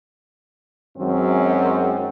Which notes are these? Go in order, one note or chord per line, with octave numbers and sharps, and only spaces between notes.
F#2 D#3 F#3 G#3 C4